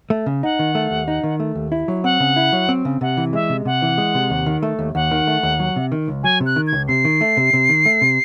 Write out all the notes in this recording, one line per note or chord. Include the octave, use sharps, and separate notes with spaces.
A3
C#3
D#4 F#5
D#3
A3
D#2
D#4
D#3
A3
D#2
E4
F#3
C4 F#5
C#3
E4
F#3
C4
C#3
C3 F#5
E3
G#3 E5
C3
C3 F#5
E3
G#3
C3
D#2
D#3
A3
D#2
D#2 F#5
D#3
A3
D#2
F#3
C3
D#3
C#2
F#3 G#5
C3
F#6
D#3
G#6
C#2
C3 C7
D#3
A3
C3
C3
D#3
A3
C3